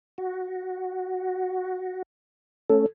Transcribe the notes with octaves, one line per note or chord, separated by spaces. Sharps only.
F#4
A3 C#4 A4